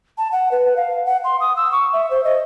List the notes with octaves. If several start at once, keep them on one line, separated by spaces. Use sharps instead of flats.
A5
F#5
B4
F5
F#5
C6
D#6
E6
C#6
E5
C5
D#5